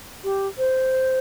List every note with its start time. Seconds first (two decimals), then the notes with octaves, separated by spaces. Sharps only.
0.23 G4
0.58 C5